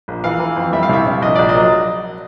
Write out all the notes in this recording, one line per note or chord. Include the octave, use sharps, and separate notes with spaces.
A#1
E3 F5
E3
F2
G3 E5
F5
C2 E5
C2
A#1 D#5
A#1 D5
D#5
F#3